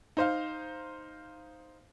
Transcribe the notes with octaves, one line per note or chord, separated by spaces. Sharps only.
D#4 C5 F5